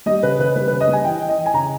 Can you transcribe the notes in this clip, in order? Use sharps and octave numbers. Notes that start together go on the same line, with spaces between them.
G3 D#5
C#3 B4
C#3 B4
G3 B4
C#3 B4
D#5
G3
G#5
E3 G5
E3
D#5
E3
G#5
C#3 A#5